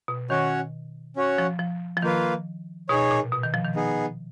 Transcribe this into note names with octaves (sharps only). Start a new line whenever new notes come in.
B2
D#3 C#4 F#4 C#5 F#5
C#4 F#4 C#5 F#5
F3
F3
F3
D#3 A#3 F4 B4 F5
B2 D#4 G#4 C#5
A#2
B2
D#3
F3
D#3
B3 D#4 G#4